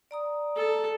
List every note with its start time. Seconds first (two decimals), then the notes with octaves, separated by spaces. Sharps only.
0.11 D5 A#5 D#6
0.56 A4